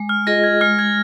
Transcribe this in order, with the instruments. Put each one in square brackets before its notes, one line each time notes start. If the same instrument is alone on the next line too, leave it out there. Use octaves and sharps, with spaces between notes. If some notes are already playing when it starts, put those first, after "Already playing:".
Already playing: [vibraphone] G#3
[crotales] F6
[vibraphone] F4 G#4 D#5 [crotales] A#6
[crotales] G#6
[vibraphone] G#3 [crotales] F6
[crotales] G#6